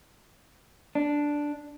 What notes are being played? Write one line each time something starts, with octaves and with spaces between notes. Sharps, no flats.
D4